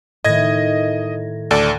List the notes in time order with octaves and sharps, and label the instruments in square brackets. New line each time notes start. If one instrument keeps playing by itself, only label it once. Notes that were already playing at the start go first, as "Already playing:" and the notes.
[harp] A2 D#3 [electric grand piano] D#5 G#6 A#6
[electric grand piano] D2 A4 D5